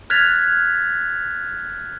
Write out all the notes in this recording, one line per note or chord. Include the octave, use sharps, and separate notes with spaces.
F6 F#6 G#6 A6 B6 F7